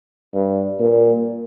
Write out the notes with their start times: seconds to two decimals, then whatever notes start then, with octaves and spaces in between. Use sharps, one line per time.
0.33 G2
0.79 A#2